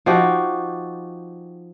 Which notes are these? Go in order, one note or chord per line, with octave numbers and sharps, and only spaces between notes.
F3 D#4 F#4 G4